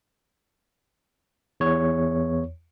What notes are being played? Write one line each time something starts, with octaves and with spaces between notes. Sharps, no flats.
E2 C#5